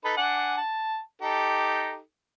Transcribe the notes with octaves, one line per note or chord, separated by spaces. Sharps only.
D#4 A4 B4
D4 F#5 G#5
A5
D#4 G4 A4